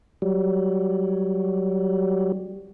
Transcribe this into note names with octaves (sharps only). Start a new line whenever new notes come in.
F#3 G3